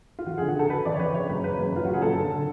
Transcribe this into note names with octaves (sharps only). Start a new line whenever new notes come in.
F4
F2 F#4
G#4
D3
F#4
D3 A4
D3 B4
F2 D5
C#5
F2 B4
C#3 C#5
F#2 B4
C#3 B4
F#2
F#2 F4
C#3 F#4
G#4
F#2 A4
D3
D3